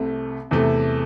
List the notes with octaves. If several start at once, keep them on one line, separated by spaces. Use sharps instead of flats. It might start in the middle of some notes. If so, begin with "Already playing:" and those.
Already playing: C2 C3 A3
E2 C3 A3